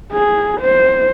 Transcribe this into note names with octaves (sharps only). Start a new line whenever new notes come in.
G#4
C5